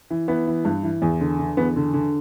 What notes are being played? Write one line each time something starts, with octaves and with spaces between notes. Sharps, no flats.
E3
E3 B3
E3
G2
E3
E2
D3
D3
E2 B3
D3
D3